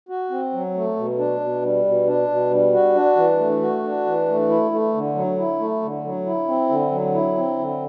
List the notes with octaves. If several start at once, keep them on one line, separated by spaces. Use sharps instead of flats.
F#4
C4
F#3
A3
B2
D4
B2
G3
B2
D4
B2
G3
F#4
D4
E3
A3
F#4
D4
E3
A3
E4
A3
D3
F#3
E4
A3
D3
F#3
E4
C4
D3
F#3
E4
C4
D3